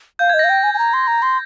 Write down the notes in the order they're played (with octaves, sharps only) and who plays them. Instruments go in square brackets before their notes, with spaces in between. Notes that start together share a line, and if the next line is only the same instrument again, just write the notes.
[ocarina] F5 [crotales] G6
[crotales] G#6
[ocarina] D#5
[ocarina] F5 [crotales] A#6
[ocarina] G5
G#5
G#5
A#5
C6
A#5
C6